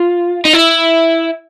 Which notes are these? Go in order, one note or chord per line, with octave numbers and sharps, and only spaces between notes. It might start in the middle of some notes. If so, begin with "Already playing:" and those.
Already playing: F4
D#4
E4